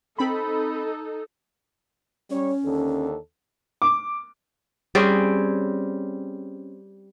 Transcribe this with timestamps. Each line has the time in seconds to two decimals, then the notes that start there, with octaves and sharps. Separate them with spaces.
0.19 C4 D#4 A4 B5
2.30 G3 C#4 C#5
2.64 D#2 D3 A4
3.82 D6
4.95 G3 C4 C#4 G#4